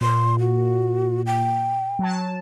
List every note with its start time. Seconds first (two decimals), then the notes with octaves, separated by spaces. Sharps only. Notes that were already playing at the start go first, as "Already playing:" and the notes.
0.01 A#2 C6
0.39 F#4
1.26 G5
1.99 F#3 A5